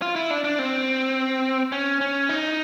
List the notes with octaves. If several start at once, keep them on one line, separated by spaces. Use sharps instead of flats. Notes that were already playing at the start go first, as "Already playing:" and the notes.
F4
E4
D4
D4
C4
C#4
C#4
D#4